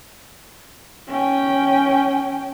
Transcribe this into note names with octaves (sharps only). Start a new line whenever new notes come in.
C#4 G5